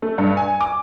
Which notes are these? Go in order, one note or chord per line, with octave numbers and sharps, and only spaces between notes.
A3
G2
G#5
D6